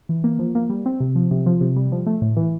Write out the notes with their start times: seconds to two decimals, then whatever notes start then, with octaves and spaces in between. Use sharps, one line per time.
0.09 E3
0.24 A#3
0.39 F3
0.55 A#3
0.70 G3
0.86 C4
1.00 C3
1.15 F3
1.31 C3
1.46 F3
1.61 C3
1.76 G3
1.92 F3
2.06 A3
2.22 A2
2.36 E3